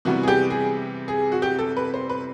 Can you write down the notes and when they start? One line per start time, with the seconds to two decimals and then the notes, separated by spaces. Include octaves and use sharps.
0.05 C3 E3 G3 B3 F#4
0.23 G#4
0.28 G4
0.50 G#4
1.08 G#4
1.32 F#4
1.42 G4
1.59 A4
1.77 B4
1.94 C5
2.10 B4